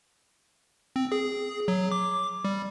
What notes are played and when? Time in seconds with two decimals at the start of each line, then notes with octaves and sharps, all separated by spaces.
0.96 C4
1.12 G#4
1.68 F#3
1.92 D6
2.45 G3